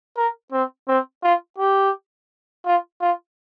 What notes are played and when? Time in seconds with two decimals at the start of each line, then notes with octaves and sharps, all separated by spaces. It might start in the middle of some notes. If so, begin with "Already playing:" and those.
0.17 A#4
0.52 C4
0.88 C4
1.23 F4
1.58 G4
2.66 F4
3.01 F4